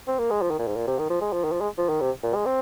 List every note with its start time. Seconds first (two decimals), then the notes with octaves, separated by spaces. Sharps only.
0.07 C4
0.19 A#3
0.30 G#3
0.42 F3
0.50 D#3
0.59 A#2
0.67 G#2
0.76 A#2
0.87 C3
0.99 D#3
1.10 F3
1.21 G#3
1.33 F3
1.44 D#3
1.52 F3
1.61 G#3
1.78 F3
1.89 D#3
2.00 C3
2.23 A#2
2.35 G#3
2.46 C4